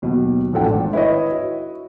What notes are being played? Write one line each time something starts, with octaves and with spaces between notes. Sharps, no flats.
D#2 B2 F#3
A1 F3 D4 A4 F#5 G5
G#1
E4 B4 C#5 D#5
F#4